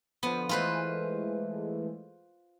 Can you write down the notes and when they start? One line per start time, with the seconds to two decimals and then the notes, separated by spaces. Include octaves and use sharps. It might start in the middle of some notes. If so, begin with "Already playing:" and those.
0.23 D3 F3 B3
0.49 E3 G#3 A3 F4 B4 C5